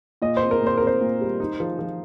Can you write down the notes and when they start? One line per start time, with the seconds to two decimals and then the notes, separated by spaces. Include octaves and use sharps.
0.22 A#2 D#5
0.37 C5
0.42 C4
0.51 A#4
0.61 A#2
0.67 C5
0.77 C4 A#4
0.87 C5
1.01 A#2
1.21 G3
1.40 D#4
1.60 F3
1.79 F3